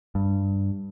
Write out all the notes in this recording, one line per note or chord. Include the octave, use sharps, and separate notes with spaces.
G2